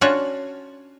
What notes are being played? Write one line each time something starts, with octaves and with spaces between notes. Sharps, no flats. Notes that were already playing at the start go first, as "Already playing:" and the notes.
C#4 D4 F4 F#4 C#5